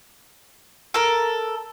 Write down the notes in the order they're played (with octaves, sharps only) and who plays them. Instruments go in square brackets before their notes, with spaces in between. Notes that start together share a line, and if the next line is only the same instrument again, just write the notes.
[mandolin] A4 A#4